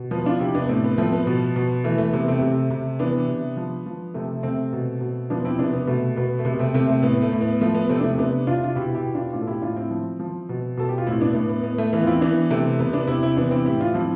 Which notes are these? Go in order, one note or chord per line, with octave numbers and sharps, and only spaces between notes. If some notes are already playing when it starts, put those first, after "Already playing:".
Already playing: B2
F3 B3
D4 F4
C3 E4 G4
B3 D4
A2 A3 C4
B3
F3 A3 C4
B3
B2
B2
E3 A3
A3
C3 B3
A3 C4
C3
C3
E3 B3 D4
C3
F3
F3
C3 A3 C4
C3 A3 C4
B2
B2
F3 B3 D4
C4 E4
C3 B3 D4
B3
B2 A3
B2 B3
A3
C3 B3
A3 C4
C3 A3 C4
A3 C4
A2 B3
A3
A2
B3
F3 A3
B3
C3 A3 C4
D4
A3 C4
C3 B3 D4
C3 D4 F4
F4
B2 E4 G4
E4 G4
B2
D4 F4
A2 D4 F4
A4
E4 G4
A2 D4 F4
C4 E4
F3
F3
B2
B2 A4
G4
F4
A2 C4 E4
B3 D4
A2 B3
B3
A2 B3
A3
E3 B3
F4
C4 E4
E3 B3 D4
C3 A3 C4
C3 B3
B3 D4
C3 C4 E4
C4 E4
E3 B3 D4
C4 E4
A2 E4 G4
D4 F4
F3 C4 E4